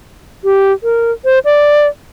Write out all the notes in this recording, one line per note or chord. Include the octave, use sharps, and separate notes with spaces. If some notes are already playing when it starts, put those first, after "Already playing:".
G4
A#4
C5
D5